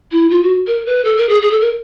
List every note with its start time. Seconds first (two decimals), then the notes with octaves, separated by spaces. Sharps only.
0.12 E4
0.30 F4
0.43 F#4
0.67 A#4
0.86 B4
1.05 A4
1.17 A#4
1.29 G#4
1.42 G#4
1.51 A4
1.61 A#4